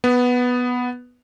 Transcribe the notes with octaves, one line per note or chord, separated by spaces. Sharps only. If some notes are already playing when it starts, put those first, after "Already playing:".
B3